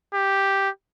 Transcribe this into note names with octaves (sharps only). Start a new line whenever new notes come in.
G4